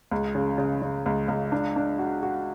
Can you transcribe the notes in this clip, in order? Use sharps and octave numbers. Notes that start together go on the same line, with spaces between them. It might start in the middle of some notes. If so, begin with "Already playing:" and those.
C#2
C#3
C#3
C#3
C#2
C#2
D4
D4
F#4
F#4